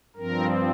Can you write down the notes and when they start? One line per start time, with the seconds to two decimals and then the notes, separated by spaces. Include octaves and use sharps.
0.16 G2 F3 C4 A#4